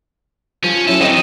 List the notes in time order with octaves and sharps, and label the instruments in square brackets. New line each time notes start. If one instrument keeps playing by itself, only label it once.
[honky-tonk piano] F3 [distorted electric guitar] C#4
[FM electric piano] F#3 C#4 E4 [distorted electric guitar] A4
[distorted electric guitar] E3 D#4 [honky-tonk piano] C4 D#5 E7